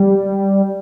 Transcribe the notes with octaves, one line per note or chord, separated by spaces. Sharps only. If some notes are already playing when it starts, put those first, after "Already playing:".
Already playing: G3